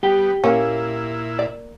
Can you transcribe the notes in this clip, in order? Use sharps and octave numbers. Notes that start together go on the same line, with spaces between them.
G3 B3 G4 G5
A#2 A#3 C#4 E4
D5